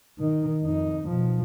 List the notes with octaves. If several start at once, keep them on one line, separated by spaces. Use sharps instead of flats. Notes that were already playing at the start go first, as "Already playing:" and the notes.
D#3 D#4
F2 D#4
B2 F3